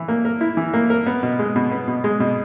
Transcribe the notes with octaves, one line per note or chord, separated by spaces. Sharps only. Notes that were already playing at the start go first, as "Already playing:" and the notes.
Already playing: E3 E4
A#3
A#4
E4
E3
A#3
A#4
B3
B2
G#3
B2
B3
B2
G#3
B2